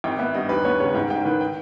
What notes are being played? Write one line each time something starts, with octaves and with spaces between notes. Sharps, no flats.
G#1 G5
B3 E5
G2 D#5
D#2 B4
B3 C#5
C#3 C#5
G#2 G5
G#2 G5
D#3 B4
G5